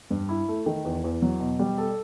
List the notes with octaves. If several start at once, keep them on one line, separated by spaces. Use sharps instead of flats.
G2
E4
A3
D#3
E2
E2
F#3
B2
G3
A4